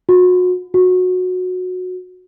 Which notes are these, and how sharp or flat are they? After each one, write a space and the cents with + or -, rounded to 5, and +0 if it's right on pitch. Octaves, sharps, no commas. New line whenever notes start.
F#4 -35
F#4 -20